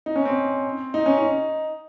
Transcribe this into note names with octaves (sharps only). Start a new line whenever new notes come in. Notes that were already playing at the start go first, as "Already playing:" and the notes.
D#4
C#4
C4
D#4
C#4
D#4